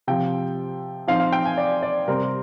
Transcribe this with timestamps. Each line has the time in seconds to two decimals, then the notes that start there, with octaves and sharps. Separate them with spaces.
0.07 C3 F3 C4 F4 G5
1.08 F3 C4 D#4 F5
1.20 F5
1.33 G5
1.45 G#5
1.57 D5
1.83 D5
2.08 C3 G3 C4 A#4